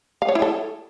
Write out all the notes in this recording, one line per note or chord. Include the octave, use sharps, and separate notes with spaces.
F5
C#5
E4
A4